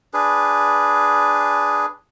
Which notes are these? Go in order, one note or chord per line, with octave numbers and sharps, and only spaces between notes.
D4 G#4 B4